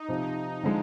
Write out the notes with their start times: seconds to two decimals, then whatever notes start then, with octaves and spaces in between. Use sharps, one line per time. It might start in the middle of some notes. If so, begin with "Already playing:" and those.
Already playing: D#4
0.08 C3 F3 C4
0.63 D3 F3 G#3